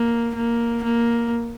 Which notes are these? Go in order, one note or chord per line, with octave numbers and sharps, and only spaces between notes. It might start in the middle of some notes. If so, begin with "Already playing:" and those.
Already playing: A#3
A#3
A#3